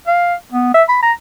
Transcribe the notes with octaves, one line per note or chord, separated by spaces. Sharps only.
F5
B3
E5
B5
A#5